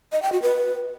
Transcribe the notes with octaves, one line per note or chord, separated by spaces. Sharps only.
D#5
G5
F#4
B4